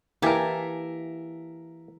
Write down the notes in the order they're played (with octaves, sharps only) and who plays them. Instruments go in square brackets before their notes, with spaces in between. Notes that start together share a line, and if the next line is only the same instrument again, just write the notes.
[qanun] E3 A5 [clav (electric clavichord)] A#3 G4 G#5 [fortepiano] A#4 E5